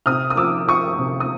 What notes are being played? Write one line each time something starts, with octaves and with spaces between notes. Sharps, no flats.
C3 D#6 F6
D#6
F3 D6 E6
F3 C#6 D#6
C3
D#6